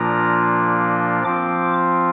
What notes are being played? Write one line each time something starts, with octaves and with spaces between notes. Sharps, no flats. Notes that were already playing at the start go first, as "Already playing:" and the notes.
Already playing: A#2 F3 A#3 D4 F4 A#5
F3 C4 F4 D6